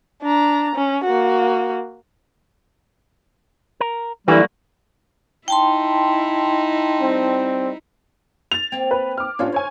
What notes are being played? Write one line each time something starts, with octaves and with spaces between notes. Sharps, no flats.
D4 A#5
C#4
A#3 F#4
A#4
G2 D3 E3 F#3 G3 A#3 F#4
D#4 E4 G5 A5 C6
G3 C4
A6 F7
A#3 C4
B4
D6 F6
A2 C3 F3 C#4 D4 F4
D2 C5 C#5 G#5